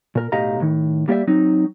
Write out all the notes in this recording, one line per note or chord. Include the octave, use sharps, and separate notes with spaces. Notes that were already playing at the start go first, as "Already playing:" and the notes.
A#2 A#4
B1 A2 G4 D#5 F5 A#5
A2 D#3
G3 A#3 G4 C#5 D5 E5
F#3 C4 D#4